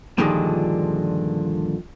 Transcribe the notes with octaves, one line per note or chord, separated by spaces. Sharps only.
G2 A#2 D3 D#3 F3 G#3